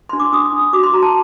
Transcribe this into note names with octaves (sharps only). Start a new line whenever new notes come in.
D4 C6
D6
D4 D#6
D4
F#4 D6
C6
F#4 A#5
A5